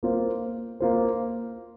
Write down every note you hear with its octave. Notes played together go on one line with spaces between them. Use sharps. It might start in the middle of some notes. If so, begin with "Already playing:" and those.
A#3 F4 C5
A#3 F4 C5